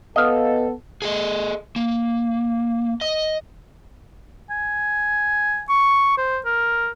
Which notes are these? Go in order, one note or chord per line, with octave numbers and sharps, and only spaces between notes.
B3 A4 D#5 F5
G#4 A4 D#5
A#3
D#5
G#5
C#6
C5
A#4